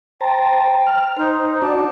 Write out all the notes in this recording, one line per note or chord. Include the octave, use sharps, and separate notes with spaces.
C5 G5 A5 A#5
F6
D#4 C5
D4 F#4 D5 A5